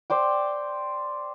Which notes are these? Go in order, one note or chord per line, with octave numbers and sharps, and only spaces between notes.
C5 D5 G5